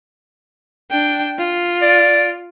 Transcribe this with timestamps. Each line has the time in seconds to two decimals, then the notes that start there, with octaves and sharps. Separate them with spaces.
0.91 D4 G5
1.39 F4
1.81 D5